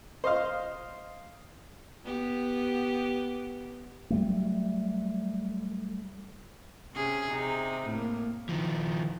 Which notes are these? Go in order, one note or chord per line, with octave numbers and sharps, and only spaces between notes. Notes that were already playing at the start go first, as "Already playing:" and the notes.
C5 D#5 F5 C6
B3 G4
F#3 G3 A3
C3 C#4 G#4
C3 D#4
A2 A#3
D#3 F3